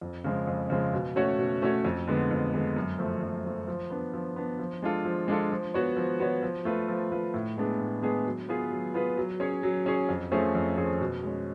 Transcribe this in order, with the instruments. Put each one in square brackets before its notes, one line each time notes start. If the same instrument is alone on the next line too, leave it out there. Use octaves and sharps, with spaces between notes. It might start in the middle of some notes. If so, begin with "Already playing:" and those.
[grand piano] F2
C#3 F3 G#3
F2
C#3 F3 G#3
B2
A3 C#4 F#4 C#5
B2
A3 C#4 F#4 C#5
F2
D3 G#3 B3
F2
D3 G#3 B3
F#2
F3 A3
F#2
F3 A3
F3
B3 D4
F3
B3 D4
F3
G#3 D4 F4 A4
F3
G#3 D4 F4 A4
F3
B3 F#4 C#5
F3
B3 F#4 C#5
F3
A3 F4 B4
F3
A3 F4 B4
A2
G#3 B3 D4 G#4
A2
G#3 B3 D4 G#4
F#3
B3 F4 G#4 B4
F#3
B3 F4 G#4 B4
F#3
C#4 G#4 C#5
F#3
C#4 G#4 C#5
F2
F3 A3 C#4 G#4
F2
F3 A3 C#4 G#4
B2
G#3 C#4